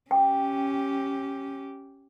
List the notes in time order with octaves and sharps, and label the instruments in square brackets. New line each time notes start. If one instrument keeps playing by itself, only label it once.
[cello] C#4 G4 [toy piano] G5